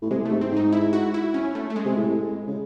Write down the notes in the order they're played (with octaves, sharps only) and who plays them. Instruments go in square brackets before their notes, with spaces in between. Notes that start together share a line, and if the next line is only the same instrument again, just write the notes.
[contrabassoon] A2
[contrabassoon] C3 [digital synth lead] G#3
[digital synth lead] A3
[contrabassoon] G#2
[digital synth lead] C4
[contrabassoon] G#2
[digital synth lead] D#4
E4
F#4
E4
C#4
A3
A3
G#3
[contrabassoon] C3
A2
C#3